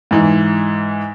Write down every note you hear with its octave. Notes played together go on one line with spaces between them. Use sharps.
G#2 E3